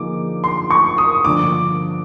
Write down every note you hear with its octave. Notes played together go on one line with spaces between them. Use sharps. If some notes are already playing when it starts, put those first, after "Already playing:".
Already playing: D3 F3 A#3 D#4 G#4 D6
C6
C#6
D#6
G2 D3 F3 A#3 D6